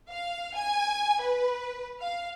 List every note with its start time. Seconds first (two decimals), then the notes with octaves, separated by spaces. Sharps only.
0.11 F5
0.55 G#5
1.22 B4
2.01 F5